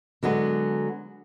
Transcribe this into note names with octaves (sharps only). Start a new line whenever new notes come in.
D3 F#3 G#3 B3